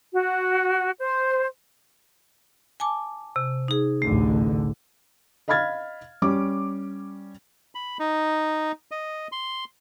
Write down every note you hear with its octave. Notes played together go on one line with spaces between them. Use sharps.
F#4
C5
G#5 A5 D6
C3
D#4 G#4
A1 D2 D3 A3
D#5 F5 B5 F6 G#6 A6
G3 C#4 D6
B5
D#4
D#5
C6